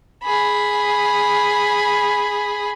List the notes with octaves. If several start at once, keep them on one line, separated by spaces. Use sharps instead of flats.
G#4 B5